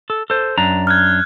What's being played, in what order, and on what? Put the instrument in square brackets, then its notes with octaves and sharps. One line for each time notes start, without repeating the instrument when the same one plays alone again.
[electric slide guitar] A4
A4 C5
F#2 D4 A#5
[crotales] F6 F#6 G#6